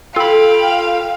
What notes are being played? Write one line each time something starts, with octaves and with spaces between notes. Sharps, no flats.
F4 A4 F5 G5 B5